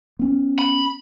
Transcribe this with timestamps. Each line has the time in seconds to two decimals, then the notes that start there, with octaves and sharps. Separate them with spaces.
0.19 B3 C#4
0.59 B5